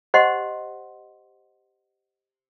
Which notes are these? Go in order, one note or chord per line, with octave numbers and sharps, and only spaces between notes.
G4 C5 D#5 F#5 C6